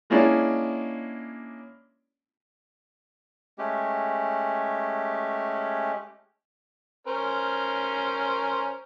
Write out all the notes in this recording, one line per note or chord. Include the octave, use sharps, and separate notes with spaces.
G#3 A#3 C#4 D4 E4 D5
G#3 A3 C#4 G4
C#4 A#4 C5